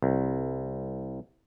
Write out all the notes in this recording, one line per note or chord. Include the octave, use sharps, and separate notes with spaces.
C2